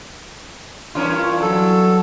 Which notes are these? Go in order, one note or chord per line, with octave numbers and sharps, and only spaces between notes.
G2 E3 C#4 F4 A#4
F#3 A4